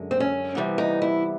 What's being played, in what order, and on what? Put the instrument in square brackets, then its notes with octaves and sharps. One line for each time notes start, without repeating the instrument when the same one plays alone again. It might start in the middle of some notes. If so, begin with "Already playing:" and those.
Already playing: [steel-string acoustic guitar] F#2 D3 G#3
C4
C#4
C3 E3 G3 B3
D#4
E4